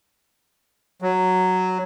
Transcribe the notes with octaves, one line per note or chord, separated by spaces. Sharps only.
F#3